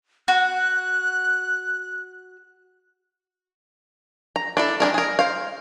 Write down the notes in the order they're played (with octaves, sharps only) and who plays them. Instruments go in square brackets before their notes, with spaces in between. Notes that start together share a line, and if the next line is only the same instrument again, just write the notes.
[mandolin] F#4 [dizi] F#6
[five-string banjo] A#5
D4 E4 A4
G3 D4 G#4 A#4
G#4 A#4
C5 F5